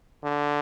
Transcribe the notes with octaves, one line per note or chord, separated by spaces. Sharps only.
D3